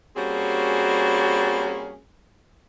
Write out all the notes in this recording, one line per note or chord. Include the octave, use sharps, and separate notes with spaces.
G3 A#3 C4 C#4 F#4 G#4